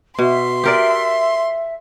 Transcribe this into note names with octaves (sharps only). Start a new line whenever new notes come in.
B2 E5 C6
G4 A#4 D5